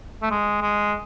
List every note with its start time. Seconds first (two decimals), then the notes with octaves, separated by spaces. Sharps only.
0.22 A3
0.31 G#3
0.61 G#3